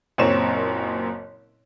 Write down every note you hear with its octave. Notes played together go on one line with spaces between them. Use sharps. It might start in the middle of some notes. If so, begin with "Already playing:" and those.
F#1 F#2 A#2 C4 C#5 E7